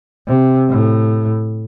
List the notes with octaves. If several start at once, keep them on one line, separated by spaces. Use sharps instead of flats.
C3
A2